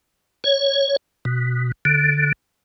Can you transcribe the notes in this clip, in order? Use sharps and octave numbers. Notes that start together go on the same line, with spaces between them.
C#5
B2
D3